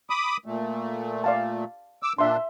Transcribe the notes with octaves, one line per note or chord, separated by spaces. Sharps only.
B5 D6 D#6
A#2 A3
D5 F5 A5
D6 E6
A#2 D4 E5 C6